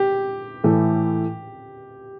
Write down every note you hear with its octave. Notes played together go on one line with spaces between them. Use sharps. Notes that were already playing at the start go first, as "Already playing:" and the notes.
Already playing: G4
A2 E3 A3